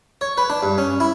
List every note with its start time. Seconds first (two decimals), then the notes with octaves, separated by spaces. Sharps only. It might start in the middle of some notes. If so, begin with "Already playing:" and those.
0.21 C#5
0.38 B4
0.50 D4
0.63 G2
0.78 C#4
1.00 E4